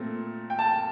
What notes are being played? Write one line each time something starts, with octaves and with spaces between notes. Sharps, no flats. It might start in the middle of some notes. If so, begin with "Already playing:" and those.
Already playing: A#2 A3 C4
G5
A5